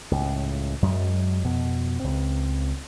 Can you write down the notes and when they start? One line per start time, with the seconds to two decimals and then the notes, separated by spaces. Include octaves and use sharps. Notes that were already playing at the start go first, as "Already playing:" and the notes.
0.11 C#2 A2
0.82 F#2 F#3 G#3
1.44 F2 B2
2.00 C#2 C4